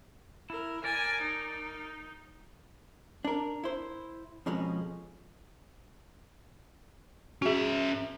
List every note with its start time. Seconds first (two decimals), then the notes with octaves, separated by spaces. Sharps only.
0.50 E4 A#4
0.84 A#4 D5 G#5 A5
1.21 D#4
3.25 D4 A#4
3.64 E4 C5
4.46 F2 G#2 B2 F3 G#3 C#4
7.42 C#4 F#4 G#4 E5